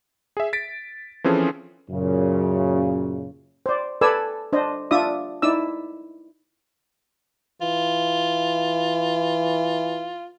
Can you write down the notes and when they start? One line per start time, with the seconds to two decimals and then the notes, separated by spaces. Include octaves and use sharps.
0.37 G#4 E5
0.53 A6 B6 D7
1.24 E3 F3 C4 C#4 G#4 A4
1.90 F#2 A#2 C#3
3.66 C5 D5
4.01 A4 B4 D5 G#5 E6
4.53 D4 C5 D#5
4.91 D4 F4 D5 E5 D#6
5.42 D#4 E4 D5 E6
7.61 E3 F4